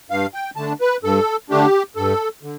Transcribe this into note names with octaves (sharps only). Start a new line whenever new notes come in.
G2 F5
G5
D3 A3 D4 A5
B4
G2 A4
D3 A3 D4 G4
G2 A4
D3